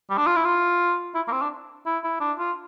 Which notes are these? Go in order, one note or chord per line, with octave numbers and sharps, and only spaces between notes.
G3
D4
F4
E4
F4
E4
A#3
C4
D4
E4
E4
D4
F4